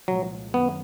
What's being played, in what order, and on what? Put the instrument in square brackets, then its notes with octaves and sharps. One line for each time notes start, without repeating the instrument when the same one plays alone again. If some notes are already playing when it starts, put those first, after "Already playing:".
[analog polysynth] C2 A#2 F3 G#3 [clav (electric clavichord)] F#3
[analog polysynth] F#2 D#3 F#3 [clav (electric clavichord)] B3